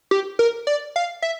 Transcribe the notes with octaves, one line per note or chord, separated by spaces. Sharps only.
G4
A#4
D5
F5
E5